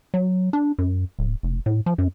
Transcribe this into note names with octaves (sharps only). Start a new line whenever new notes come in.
F#3
D4
F#2
D1
F1
A2
F3
F#2